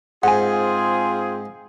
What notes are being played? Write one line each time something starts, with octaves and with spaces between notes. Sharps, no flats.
G#2 C4 F4 G#4 F#5 G#5